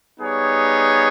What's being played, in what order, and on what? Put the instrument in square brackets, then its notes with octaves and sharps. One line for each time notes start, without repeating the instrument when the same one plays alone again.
[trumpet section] G3 B3 D#4 G#4 C#5